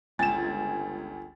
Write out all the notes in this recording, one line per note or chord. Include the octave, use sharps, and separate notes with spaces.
G1 C#2 G#5 A6 E7